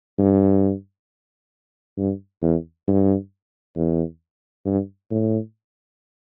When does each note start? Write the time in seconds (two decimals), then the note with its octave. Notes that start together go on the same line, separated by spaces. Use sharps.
0.18 G2
1.97 G2
2.42 E2
2.87 G2
3.76 E2
4.65 G2
5.11 A2